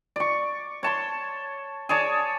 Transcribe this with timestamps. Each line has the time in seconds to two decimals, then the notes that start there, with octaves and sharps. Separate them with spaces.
0.16 D5 C#6
0.83 C#5 A5 C6
1.89 G#4 C#5 D5 A5